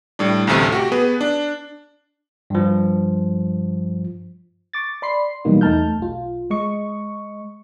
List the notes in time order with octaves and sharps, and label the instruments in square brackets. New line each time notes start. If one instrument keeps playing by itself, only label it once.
[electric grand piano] A2 G3 D4
A1 D2 C3 A3
F#4 G4
B3 G#4 B4
D4
[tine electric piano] G2 F3
[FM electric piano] C#6 D6 A6
D5 B5 C6 C7
B2 E3 F#3 G3 A#3 D#4
E2 A3 D#4 A5 F6 G6
B1 F4
G#3 D#5 C#6